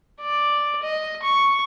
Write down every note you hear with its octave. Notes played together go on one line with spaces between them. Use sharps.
D5
D#5
C#6